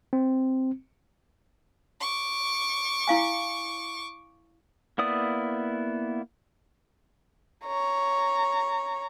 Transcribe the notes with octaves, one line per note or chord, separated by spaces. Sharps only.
C4
C#6 D6
E4 F5 G#5
A#3 B3 E4 D5 D#6
C#5 A#5